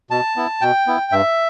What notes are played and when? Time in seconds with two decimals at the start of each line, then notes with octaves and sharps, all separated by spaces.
0.11 B2 A5
0.36 B3 E4
0.61 B2 G5
0.87 B3 E4
1.12 G2 E5